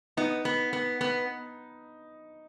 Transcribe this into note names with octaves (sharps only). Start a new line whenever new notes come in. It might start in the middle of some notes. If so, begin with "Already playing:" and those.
B3 D#4
B3
B3
B3